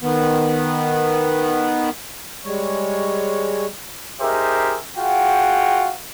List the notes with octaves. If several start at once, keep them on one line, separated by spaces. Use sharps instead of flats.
D#3 B3
G3 G#3 C#5
D#4 G4 G#4 A#4 C5 E5
F4 F#4 G#4 F#5 G5